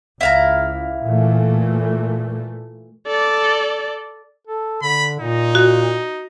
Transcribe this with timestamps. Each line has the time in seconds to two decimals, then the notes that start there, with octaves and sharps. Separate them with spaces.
0.21 C#2 E4 F5 A#5
1.04 A#2 E3 A3
3.07 A4 D5
4.47 A4
4.82 D3 B5
5.19 A#2 D#4
5.55 F#4